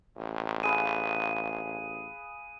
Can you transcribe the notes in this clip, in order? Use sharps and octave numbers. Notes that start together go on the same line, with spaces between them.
A1
G#4 B4 F5 D#7